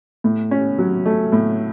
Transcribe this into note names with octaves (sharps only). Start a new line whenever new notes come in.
A2
C#4
F#3
A3
A2